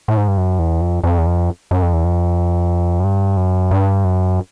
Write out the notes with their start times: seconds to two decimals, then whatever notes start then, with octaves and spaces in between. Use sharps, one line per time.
0.08 A2
0.17 G#2
0.28 G2
0.37 F#2
0.59 E2
0.81 F2
1.04 F2
1.18 E2
1.26 F2
1.71 F#2
1.82 F2
1.93 E2
2.05 F2
3.00 F#2
3.04 G2
3.37 F#2
3.71 G2
4.04 F#2